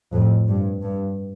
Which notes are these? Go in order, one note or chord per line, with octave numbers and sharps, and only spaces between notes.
F2 A2
G2
G2